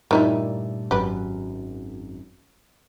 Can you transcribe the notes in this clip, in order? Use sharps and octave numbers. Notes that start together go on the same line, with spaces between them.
G2 A#2 D#3 A3 D#4 E4
G#1 F#2 G4 B4